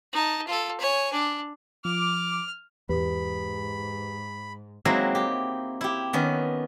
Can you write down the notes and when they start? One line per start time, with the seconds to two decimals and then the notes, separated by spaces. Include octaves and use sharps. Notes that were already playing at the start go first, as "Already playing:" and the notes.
0.12 D#4 A5
0.47 F4 A4
0.80 C#5 G#5
1.13 D4
1.85 F3 D6 F6
2.89 E2 G#2 G4 B4 B5
4.85 F#3 G#3 A#3 C4 D#4 E4
5.15 G4
5.81 E4 G4
6.13 D#3 B3 C#4